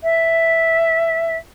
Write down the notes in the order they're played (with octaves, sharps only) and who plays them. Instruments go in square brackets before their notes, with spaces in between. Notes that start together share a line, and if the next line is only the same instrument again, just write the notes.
[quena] E5